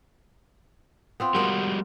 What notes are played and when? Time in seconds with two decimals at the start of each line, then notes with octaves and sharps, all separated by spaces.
1.20 B3 C4 F4
1.35 G3 G#3 B3 F#4 A#4